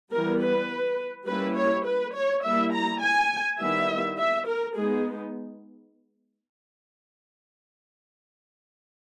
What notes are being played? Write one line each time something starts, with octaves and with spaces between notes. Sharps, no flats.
E3 G3 B3 A#4
B4
G3 A#3 C#4 E4 B4
C#5
B4
C#5
G3 A#3 E4 E5
A#5
G#5
D#3 G3 B3 E4 E5
E5
A#4
G#3 B3 D#4 G#4